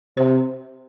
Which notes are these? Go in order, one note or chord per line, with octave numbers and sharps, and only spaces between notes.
C3 C5